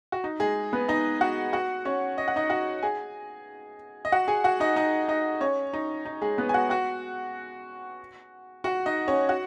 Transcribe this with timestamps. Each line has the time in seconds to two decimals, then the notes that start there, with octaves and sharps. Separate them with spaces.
0.12 F#4
0.24 D#4
0.40 G#3 G#4
0.73 B3 B4
0.89 D#4 D#5
1.21 F#4 F#5
1.53 F#4 F#5
1.85 C#4 C#5
2.18 D#5
2.28 F#5
2.36 D#4 D#5
2.50 F#4 F#5
2.83 G#4 G#5
4.05 D#5
4.12 F#4 F#5
4.28 G#4 G#5
4.44 F#4 F#5
4.60 D#4 D#5
4.76 D#4 D#5
5.08 D#4 D#5
5.41 C#4 C#5
5.73 D#4
6.05 D#4
6.22 G#3 G#4
6.38 B3 B4
6.49 G#5
6.54 F#4 F#5
6.70 F#4 F#5
8.64 F#4 F#5
8.86 D#4 D#5
9.08 C#4 C#5
9.29 F#4 F#5